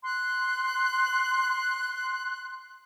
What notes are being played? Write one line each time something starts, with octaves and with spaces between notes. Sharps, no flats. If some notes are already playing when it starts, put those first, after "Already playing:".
C6 F#6